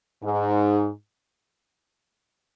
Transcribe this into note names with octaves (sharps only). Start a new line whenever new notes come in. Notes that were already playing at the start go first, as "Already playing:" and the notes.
G#2